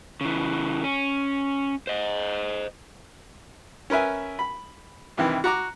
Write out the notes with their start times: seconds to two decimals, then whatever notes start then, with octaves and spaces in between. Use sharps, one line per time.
0.21 C#3 E3
0.84 C#4
1.87 C5 D#5
3.90 C#4 A#4 B4 E5 G#5
4.39 B5
5.18 G2 C3 D#3 E3
5.44 F#4 A#5 D6